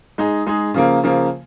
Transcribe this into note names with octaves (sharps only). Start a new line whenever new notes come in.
G#3 D#4 G#4
G#3 D#4 G#4
C#3 F3 A#3
C#3 F3 A#3